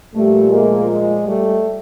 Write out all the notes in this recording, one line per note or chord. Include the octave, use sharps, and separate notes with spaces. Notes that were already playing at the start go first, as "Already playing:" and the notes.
A#2 F3 G3 A3
G#3 A#3
G#3
G3 A3